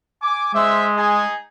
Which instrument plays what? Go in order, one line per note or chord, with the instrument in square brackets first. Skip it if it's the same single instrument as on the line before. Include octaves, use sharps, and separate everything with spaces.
[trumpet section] G#5 D6
[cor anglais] G#3 [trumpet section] C5 E5
[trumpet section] D#4 G#4